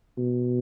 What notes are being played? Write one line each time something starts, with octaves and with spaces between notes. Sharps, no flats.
B2